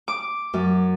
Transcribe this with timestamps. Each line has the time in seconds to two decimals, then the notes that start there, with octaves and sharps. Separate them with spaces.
0.08 D6
0.54 F#2